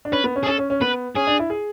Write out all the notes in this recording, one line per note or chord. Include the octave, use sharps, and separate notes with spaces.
D4
C#4 B4
B3
C#4
G#4
C#4 A4
C#4
C#4
B3 B4
C#4 G#4
D4
E4
G#4